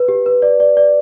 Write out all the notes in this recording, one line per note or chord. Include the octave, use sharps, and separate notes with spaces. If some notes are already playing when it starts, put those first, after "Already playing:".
Already playing: B4
G4
B4
D5
D5
D5